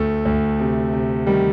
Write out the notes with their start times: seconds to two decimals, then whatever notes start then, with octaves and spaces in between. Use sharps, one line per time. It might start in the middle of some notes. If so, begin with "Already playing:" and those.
Already playing: D2 A3
0.25 D2
0.59 C3
0.93 C3
1.27 D#3 G3